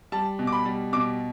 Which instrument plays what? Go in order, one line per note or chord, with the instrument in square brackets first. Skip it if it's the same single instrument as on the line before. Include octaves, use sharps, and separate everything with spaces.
[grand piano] G3 A5
B2
D6
B5
G3
B2 D6